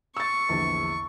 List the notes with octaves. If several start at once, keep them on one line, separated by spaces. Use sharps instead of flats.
C#6 E6 A6
A#1 E2 D3